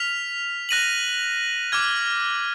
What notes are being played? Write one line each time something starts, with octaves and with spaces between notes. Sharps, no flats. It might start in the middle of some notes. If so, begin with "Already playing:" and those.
Already playing: F6 B6 F7
F#6 A#6 D#7 F#7
D6 F6 G#6